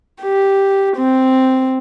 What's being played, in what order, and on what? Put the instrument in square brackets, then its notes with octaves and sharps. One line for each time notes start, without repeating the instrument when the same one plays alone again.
[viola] G4
C4